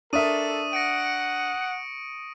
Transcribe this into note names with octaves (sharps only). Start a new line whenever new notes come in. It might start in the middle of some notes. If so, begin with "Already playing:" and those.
D4 A4 A#4 E5 C#6 D#6 D#7
F#5 A#6 C#7 D7